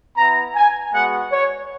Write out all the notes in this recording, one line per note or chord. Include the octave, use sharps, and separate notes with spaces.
B3 E4 A#5
G#5
G#3 B3 F#4 F#5
C#5